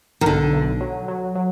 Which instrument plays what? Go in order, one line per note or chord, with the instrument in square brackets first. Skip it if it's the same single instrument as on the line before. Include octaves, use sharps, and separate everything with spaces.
[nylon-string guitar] D#3
[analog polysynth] B1 [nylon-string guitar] D3
[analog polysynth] B1
F#3
F#3
F#3